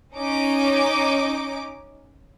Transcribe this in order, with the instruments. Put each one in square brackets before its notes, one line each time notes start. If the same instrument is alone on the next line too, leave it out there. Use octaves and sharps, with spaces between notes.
[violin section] C#4 D#4 D6